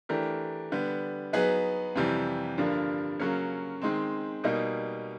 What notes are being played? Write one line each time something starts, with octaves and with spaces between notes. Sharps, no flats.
E3 A3 D4 G4 A#4
D3 G3 B3
F#3 B3 D#4 G#4 B4
F2 C3 E3 G3
G2 D3 F3 A#3 D4
C#3 F#3 A#3 C#4
D#3 G#3 C4
B2 G3 A#3 D#4